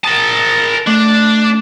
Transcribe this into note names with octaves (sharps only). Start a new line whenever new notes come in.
A#4 A5 D#6
A3 D4